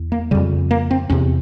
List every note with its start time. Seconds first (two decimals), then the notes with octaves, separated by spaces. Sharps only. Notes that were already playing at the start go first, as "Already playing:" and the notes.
Already playing: E2
0.12 A#3
0.31 F2 C#3 G3
0.71 A#3
0.91 C4
1.10 E2 C3 C#4